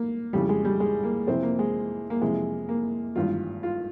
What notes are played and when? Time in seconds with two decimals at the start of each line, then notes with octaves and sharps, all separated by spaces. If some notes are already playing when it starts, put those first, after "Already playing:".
Already playing: A#3
0.33 F2 C#3 E3 G3
0.49 G#3
0.65 G3
0.80 G#3
1.04 A#3
1.27 F2 C3 E3 C4
1.43 A#3
1.59 G#3
2.10 A#3
2.22 F2 C3 E3 G#3
2.69 A#3
3.16 G#1 G2 E3 F4
3.63 F4